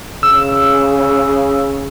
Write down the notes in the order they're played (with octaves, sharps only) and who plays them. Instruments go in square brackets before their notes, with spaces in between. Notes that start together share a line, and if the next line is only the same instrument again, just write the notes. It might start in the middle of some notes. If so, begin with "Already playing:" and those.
[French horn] C#3 [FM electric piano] E6